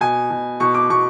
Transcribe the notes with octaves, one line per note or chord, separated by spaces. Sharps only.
B2 G#5
B2
B2 C#6
D6
B2 C#6